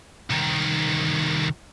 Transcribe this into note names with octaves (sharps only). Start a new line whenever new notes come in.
C2 D#3